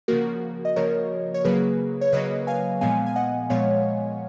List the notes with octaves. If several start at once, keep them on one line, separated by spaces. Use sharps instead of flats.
C#3 F3 A#3 F#4 A#4
D#5
C#3 F3 A#3 A#4 C#5
C#5
C#3 F#3 A#3 G#4 B4
C#5
C#3 F#3 A#3 B4 D#5
F5 G#5
A#2 F3 G#3 B3 F5 G#5
G#5
D#5 F#5
A#2 F3 G#3 B3 C#5 F5